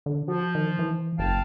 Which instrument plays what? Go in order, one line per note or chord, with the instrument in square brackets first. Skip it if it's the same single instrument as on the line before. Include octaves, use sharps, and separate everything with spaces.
[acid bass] D3
[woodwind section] F3 [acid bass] F#4
[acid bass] D#3
E3
[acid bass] F#1 [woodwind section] F5 G5 A5